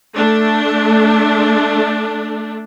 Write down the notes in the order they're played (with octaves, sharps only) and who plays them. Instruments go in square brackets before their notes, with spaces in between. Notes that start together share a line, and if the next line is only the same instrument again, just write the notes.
[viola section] A3 D4